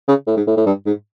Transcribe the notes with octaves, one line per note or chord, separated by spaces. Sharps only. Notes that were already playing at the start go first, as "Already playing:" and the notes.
C#3
A2
G#2
A2
A2
G2
G#2